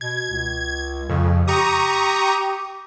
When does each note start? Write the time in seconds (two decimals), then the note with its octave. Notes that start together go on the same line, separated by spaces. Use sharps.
0.01 B2 G#6
0.31 C#2
1.10 F2 C#3
1.48 G4 A#5 C#6 D#6